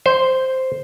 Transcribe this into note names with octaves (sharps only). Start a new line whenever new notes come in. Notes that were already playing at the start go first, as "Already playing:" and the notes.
C5